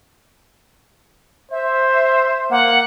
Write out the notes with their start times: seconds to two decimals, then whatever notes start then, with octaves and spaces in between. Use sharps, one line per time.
1.51 C5 E5
2.51 A#3 F#5